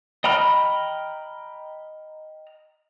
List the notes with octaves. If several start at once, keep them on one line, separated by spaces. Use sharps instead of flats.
D#5 G5 A#5 B5 F6